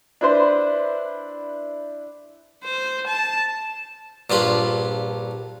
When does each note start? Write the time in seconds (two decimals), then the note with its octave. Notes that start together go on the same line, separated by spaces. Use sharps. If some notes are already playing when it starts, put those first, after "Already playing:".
0.21 D4 E4 B4 C5
2.64 C5
3.07 A5
4.30 A#1 G2 F4 B5